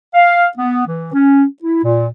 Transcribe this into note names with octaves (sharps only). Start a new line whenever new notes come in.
F5
B3
E3
C#4
E4
A#2